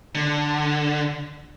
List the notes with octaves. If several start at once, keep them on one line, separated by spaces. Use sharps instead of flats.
D3